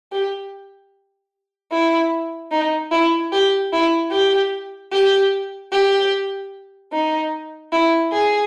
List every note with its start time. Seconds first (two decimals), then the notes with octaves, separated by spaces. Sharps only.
0.12 G4
1.72 E4
2.52 D#4
2.92 E4
3.32 G4
3.73 E4
4.12 G4
4.93 G4
5.72 G4
6.93 D#4
7.72 E4
8.13 G#4